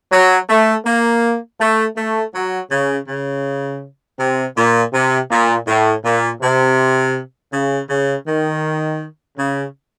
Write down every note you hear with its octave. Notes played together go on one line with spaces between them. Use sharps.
F#3
A3
A#3
A3
A3
F#3
C#3
C#3
C3
A#2
C3
A#2
A2
A#2
C3
C#3
C#3
D#3
C#3